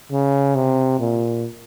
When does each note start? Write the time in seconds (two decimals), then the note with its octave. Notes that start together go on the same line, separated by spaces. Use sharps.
0.12 C#3
0.55 C3
0.99 A#2